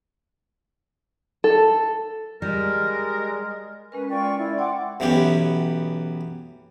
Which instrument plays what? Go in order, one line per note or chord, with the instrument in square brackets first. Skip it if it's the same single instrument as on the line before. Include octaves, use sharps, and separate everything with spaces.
[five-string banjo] A4
[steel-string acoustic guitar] G3 [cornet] G#3 [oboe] A#4
[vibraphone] G#3 C#4 A#4 [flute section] B4 G#5
[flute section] F4 D5 C#6 [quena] G5
[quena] E4 [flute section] D5
[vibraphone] D5 G5 C6 [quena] F#5 [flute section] D6
[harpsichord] B1 E3 B3 C#4 G4